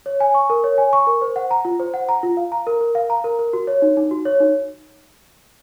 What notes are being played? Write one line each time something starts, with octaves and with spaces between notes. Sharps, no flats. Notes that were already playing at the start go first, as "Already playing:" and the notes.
C#5
G#5
C#6
A#4
C#5
G#5
C#6
A#4
C5
F#5
A#5
F4
C5
F#5
A#5
F4
F5
A#5
A#4
A#4
F5
A#5
A#4
A#4
F#4
C#5
D#4
D#4
F#4
C#5
D#4